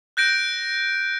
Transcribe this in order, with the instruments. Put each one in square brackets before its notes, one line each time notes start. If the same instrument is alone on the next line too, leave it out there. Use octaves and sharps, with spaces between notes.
[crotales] F#6 G6 A#6 D7